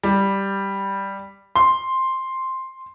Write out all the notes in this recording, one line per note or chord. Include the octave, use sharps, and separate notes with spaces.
G3
C6